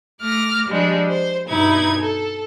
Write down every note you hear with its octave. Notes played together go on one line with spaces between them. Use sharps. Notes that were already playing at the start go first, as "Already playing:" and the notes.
A3 D6 F6 A#6
F3 G3 G#3 D4
C5
G2 B2 D#4 E4 G#6
A4